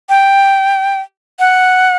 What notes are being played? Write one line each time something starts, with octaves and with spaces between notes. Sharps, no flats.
G5
F#5